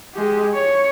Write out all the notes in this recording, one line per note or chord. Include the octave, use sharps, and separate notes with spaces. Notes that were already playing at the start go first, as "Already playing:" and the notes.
G#3 G4
C#5